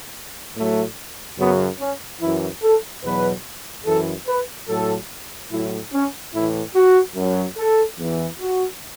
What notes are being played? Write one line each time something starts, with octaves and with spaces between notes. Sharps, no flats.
A2 F#3 A3
F#2 C#3 F#3 B3
C#4
F#2 E3 E4
A4
E2 B2 F#3 B4
F#2 E3 A4
B4
A2 F#3 A4
A2 F#3 E4
C#4
A2 E3 E4
F#4
F#2 F#3
A4
E2 E3
F#4